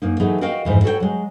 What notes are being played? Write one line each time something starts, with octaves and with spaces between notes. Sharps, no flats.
F#2 A#3 D#4
E3 F#3 A3 D#4 G#4
F#4 A#4 D#5 F5 G5
F2 G#2 E3
F#4 A4 C#5 D#5 G5
F#3 G#3